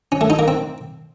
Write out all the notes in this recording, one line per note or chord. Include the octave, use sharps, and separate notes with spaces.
C#4
A3
D#4
A#3
C4